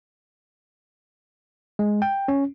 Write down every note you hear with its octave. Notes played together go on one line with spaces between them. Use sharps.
G#3
G5
C#4